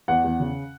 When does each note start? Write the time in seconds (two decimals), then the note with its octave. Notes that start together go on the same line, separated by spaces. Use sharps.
0.08 E2 F#5
0.24 E2
0.40 C#3